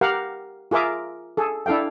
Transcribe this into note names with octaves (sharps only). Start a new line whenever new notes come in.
G4 A#4 F5 F#5
F4 G#4 A#4 E5 D6
G#4 A4
D4 E4 A4 F5 G5